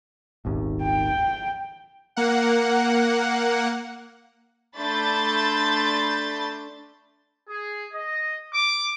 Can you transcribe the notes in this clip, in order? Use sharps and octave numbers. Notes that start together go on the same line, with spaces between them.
D#1 G#1 D#2
G5
A#3 F#5
A3 D4 B5 C6 G6 A6
G#4
D#5
D6